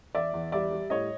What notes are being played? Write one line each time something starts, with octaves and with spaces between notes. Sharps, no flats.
E2 D5 E5
E2
G3 D5 E5
G3
A2 C#5 D#5